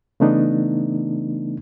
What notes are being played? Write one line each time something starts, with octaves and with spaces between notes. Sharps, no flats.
C#3 E3 A3 B3 D4 D#4